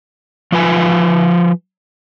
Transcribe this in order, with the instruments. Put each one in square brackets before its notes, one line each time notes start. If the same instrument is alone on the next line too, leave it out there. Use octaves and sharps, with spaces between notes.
[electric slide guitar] F3 F4 B4 G#5